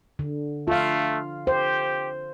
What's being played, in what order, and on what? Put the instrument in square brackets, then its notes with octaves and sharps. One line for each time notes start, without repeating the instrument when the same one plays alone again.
[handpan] D3
[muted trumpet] A3 [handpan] F4 F5
[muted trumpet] G4 [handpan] C5